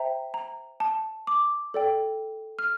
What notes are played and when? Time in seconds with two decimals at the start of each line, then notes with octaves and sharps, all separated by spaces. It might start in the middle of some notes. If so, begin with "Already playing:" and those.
Already playing: C5 E5 G5 A#5
0.34 A#5
0.80 A5
1.27 D6
1.74 A4 D5 G5
2.59 F6